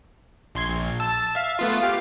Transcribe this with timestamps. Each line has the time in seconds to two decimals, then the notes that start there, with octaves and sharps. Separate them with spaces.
0.55 A#1 C6 G#6
0.69 A#1
1.00 A5 E6
1.35 E5 F5
1.59 A3 B3 F4
1.81 G4 F5